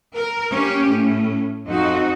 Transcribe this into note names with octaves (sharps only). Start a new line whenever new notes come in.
A#4
A#3 C#4 G4
A2 C#4
F2 D#4 F#4